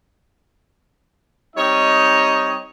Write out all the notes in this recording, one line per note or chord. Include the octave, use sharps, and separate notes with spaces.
G3 C4 D#4 C#5 D#5